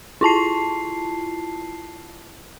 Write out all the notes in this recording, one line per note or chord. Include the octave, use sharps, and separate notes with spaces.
E4 F4 A5 C7